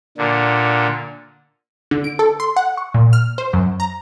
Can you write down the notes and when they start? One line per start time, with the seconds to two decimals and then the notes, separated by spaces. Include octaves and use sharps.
0.18 A#2 D3
1.91 D3
2.04 D7
2.19 A4
2.40 C6
2.56 F#5
2.77 C#6
2.94 A#2
3.13 F6
3.38 C5
3.53 F#2
3.80 A#5